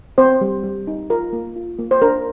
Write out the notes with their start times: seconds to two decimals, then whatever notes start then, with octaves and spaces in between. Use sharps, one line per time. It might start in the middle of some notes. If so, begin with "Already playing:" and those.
0.18 C4 C5
0.41 G3
0.64 G3
0.87 D#4
1.10 F4 A#4
1.33 A#3
1.56 F4
1.79 A#3
1.91 C5
2.02 D4 A#4